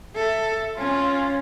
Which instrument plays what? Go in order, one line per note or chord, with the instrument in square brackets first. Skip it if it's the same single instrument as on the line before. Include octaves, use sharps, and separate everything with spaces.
[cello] A4 [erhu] E5
[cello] C#4 [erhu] F4